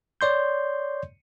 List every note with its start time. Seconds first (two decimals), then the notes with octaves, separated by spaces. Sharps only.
0.21 C#5 D5 C6 G6